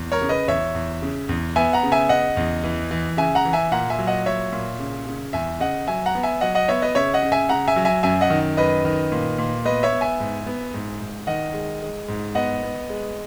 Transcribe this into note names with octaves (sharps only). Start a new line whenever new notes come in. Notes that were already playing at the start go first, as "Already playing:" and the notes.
Already playing: E2
A#4 C#5
C#3
B4 D#5
E2 C#5 E5
E2
C#3
E2
B3 E5 G#5
F#5 A#5
C#3
E5 G#5
C#3 D#5 F#5
E2
E3
E3
C#3 E5 G#5
F#5 A#5
E3
E5 G#5
A#2 F#5 A#5
E5 G#5
F#3
D#5 F#5
A#2 C#5 E5
A#2
C#3
C#3
E2 E5 G#5
C#3 D#5 F#5
F#3 E5 G#5
F#5 A#5
B3
E5 G#5
F#3 D#5 F#5
D#5 F#5
B3 C#5 E5
B4 D#5
C#3 C#5 E5
D#5 F#5
C#3
E5 G#5
C#3 F#5 A#5
E5 G#5
F#3
E5 G#5
F#2 E5 G#5
D#5 F#5
D#3
F#2 B4 D#5
D#3
A#2
A#2
B3 B4 D#5
C#5 E5
B3
E5 G#5
G#2
B3
G#2
G#2
D#3 D#5 F#5
G#3
G#3
G#2
B3 D#5 F#5
B3
G#3